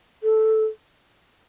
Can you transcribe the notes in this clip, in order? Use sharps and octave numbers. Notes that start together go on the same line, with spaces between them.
A4